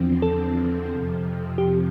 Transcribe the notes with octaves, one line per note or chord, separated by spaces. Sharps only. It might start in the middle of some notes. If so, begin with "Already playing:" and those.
Already playing: E2 D3 F3 C4
A4
F2 C3 F3
G4